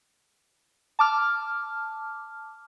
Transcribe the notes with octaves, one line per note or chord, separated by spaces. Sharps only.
A5 D6 F6